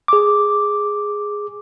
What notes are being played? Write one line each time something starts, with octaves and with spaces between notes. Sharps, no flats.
G#4 D6